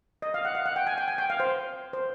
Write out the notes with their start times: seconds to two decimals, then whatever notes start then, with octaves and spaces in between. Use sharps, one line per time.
0.22 D#5
0.34 F5
0.45 F#5
0.55 F5
0.66 F#5
0.76 G5
0.87 G#5
0.98 G5
1.08 G#5
1.18 G5
1.30 F5
1.40 C5
1.93 C5